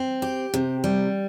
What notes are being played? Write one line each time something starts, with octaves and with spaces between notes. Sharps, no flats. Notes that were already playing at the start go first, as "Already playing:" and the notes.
Already playing: C4
G4
C3
G3